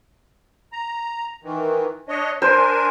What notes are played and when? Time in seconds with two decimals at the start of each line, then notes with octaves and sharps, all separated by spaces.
0.72 A#5
1.43 D#3 E3
2.08 D4 C#5 D#5
2.42 D4 A#4 C5 G#5